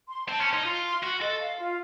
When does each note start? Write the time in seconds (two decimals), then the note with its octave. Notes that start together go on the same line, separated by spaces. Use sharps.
0.09 C6
0.27 C4 A5
0.40 C#4
0.47 C6
0.53 D#4
0.65 F4 C6
0.84 C6
1.03 F#4 C6
1.21 A4 D#5
1.40 F5
1.58 F4